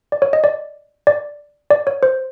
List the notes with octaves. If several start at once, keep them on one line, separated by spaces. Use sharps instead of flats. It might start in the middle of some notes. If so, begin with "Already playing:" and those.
D5
C#5
D#5
D5
D5
D5
C#5
C5